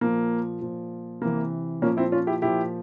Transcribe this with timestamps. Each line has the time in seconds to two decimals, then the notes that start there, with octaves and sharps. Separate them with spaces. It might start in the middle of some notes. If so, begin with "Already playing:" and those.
0.01 A#2 F3 A#3
0.61 A#2 F3
1.21 C3 E3 A#3
1.82 A#2 F3 A#3 C#4
1.97 C4 E4
2.12 C#4 F4
2.27 E4 G4
2.42 A#2 F3 E4 G4